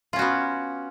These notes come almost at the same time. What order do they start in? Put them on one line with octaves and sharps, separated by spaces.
F4 C#4 F#4 B3